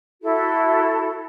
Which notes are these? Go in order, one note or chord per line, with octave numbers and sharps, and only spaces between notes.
E4 F#4 A4